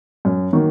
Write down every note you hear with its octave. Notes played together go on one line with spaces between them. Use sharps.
F#2
D#3 F#3 A#3